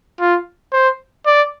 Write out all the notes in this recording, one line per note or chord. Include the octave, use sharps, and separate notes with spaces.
F4
C5
D5